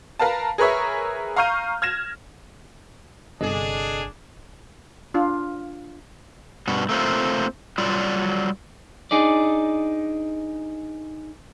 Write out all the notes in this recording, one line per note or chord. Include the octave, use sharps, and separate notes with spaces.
A#4 B4 F5 A5
G#4 A#4 B4 C#5 E5
F5 A#5 C#6 F6 G6 D#7
F6 G#6 A#6 E7
G1 C3 D4 G#4 A4 D#5
D4 F4
G2 B2 F#4
A3 A#3 C4 F4
F#3 G3 F4 D5
D4 D#4 G#4 D5